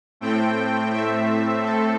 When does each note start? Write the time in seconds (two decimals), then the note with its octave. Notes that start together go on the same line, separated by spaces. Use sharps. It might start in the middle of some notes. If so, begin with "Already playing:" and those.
0.21 A2 A3 C4 G5
0.93 E5
1.64 A4